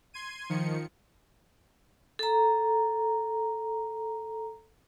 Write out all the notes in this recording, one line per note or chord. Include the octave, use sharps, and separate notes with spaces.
C6 G#6 D#7
D#3 F3 C#7
A4 A#5